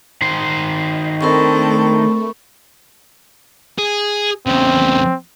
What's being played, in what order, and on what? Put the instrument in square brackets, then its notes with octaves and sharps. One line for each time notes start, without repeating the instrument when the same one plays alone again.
[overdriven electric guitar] D#3 C5
[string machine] D#5
[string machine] A3 [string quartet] C4 D4 A4 [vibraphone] A#4 B5 C#6
[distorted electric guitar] G#4
[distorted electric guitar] E2 C#3 [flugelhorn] C4